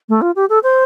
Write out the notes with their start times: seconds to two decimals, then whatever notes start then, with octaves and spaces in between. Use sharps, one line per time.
0.09 A3
0.21 F4
0.36 G4
0.49 A4
0.63 C5